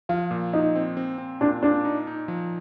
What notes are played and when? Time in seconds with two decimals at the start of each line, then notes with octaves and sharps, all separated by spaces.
0.09 F3 F4
0.31 A#2
0.53 A#2 D#4
0.75 C4
0.97 C4
1.18 C4
1.41 A#2 D4
1.63 A#2 D4
1.85 D#4
2.07 D#4
2.28 F3